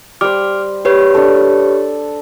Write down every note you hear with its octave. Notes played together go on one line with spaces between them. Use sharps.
G3 C5 D6 F6
G4 B4 C#5
D4 A4